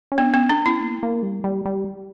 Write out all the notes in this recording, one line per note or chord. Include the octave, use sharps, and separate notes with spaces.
C#4
B3 D4
B3 C#4
B3 D4
C#4 E4
A#3
A#3
G3
G3
G3